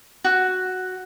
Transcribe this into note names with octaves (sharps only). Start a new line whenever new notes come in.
F#4